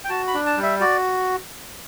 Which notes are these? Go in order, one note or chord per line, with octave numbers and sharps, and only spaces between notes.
G5
F#4 A5
B5
D4
A5
G3
E5
F#4 D5